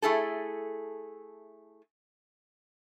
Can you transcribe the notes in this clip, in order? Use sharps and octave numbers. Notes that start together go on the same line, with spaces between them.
A3 E4 G#4 A4